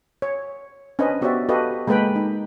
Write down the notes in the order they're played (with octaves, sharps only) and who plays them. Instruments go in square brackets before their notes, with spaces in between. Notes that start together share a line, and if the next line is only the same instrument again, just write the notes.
[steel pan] C#5
C#4 D4 B4 C5 D#5
B3 F#4 G4 C5 D5 E5
F#4 G4 A4 B4 D#5 F5
G#3 A#3 A4 B4 G5 B5
D#4